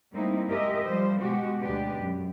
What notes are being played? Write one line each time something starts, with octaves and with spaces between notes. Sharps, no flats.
G3 A3 A#3 C4 D#4 E4
G#3 G4 A#4 D#5 E5
F3 G3 C5
B2 G#3 F#4 G4
D2 G#3 D4 G4 B4
F#2